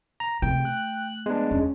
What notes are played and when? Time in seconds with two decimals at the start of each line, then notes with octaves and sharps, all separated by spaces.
0.20 A#5
0.42 C3 A3 G5
0.65 F#6
1.26 G#3 B3 D4
1.51 E2 C#4